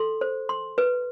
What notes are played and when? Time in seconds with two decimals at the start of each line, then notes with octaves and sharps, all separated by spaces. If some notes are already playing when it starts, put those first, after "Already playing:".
Already playing: A4 C6
0.21 C5
0.49 C6
0.78 B4